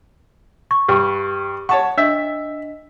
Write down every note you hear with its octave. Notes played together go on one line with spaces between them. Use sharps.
C#6
G2 G4 C#6
C#5 F#5 A5 C#6
D4 D#5 E5 B6